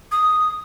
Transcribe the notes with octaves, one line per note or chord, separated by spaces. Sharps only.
D#6